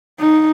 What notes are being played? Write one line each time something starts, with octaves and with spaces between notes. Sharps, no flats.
D#4